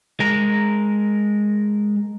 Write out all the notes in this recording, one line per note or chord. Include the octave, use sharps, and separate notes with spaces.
G#3 A#4